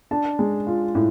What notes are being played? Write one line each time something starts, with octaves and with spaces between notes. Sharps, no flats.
D4 A5
G#3
F4
A2